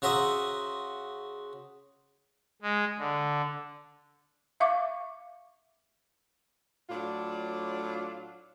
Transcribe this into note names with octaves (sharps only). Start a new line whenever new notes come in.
C#3 F#4 C5 E5 A#5 D#6
G#3
D3
E5 F5 C#6 D6
A2 F#3 D4 F4 D5